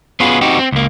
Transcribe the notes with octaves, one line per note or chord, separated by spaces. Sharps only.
B3 C#4 F4 F#4 G#4 B4
C4 D#4 F#4 G4
C4
C#2 A#3